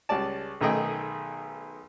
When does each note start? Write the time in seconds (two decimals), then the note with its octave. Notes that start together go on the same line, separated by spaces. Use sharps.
0.09 C#2 G3 C#4 D5 A5
0.61 B1 D#3 A3 G#4 D#5 G5